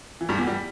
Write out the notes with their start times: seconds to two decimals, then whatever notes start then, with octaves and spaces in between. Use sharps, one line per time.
0.21 E3
0.29 G2 G3
0.38 E2 E3
0.47 G3